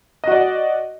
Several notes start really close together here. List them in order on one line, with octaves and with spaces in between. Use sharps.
D#5 F#4 D5 F#5